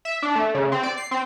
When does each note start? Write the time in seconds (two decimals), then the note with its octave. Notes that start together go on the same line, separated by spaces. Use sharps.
0.05 E5
0.22 D4
0.35 A3
0.55 C#3
0.72 C4
0.83 D5
0.97 C7
1.11 C4